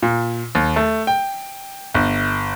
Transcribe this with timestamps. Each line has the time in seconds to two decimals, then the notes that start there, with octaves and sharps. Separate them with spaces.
0.02 A#2
0.55 D#2
0.76 A3
1.07 G5
1.94 G1